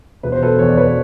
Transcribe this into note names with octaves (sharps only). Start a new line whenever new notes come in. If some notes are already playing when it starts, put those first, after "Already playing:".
E1 B4
C5
B2 A4 B4
E2 C#5
D5
E2 B4 C#5